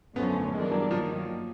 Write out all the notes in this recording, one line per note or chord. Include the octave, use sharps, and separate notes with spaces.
F#2 D3 F3 A3 B3 C#4
G2 E3 G3 G#3 A#3 D4
F#3
D#3 F3 F#3 A#3